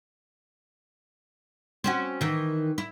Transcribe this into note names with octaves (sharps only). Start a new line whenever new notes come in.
C4 C#4 F#4
D#3 E3
E4